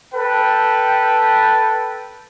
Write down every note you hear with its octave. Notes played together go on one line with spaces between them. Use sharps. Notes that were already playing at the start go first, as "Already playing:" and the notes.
A4 B4 G5